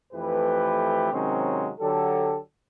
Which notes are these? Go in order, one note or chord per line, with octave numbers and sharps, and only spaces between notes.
F2 E3 A3 G4 B4
C3 D#3 F#3 G#3 C4 C#4
D3 F#3 G4 A4